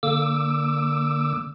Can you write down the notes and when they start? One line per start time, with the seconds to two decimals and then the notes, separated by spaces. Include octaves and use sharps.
0.03 D3 A#3 D6 E6